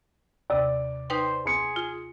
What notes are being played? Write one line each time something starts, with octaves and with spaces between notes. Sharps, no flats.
D#2 C3 D5
D#4 B4 C5 G5
G#4 C6 C#7
F4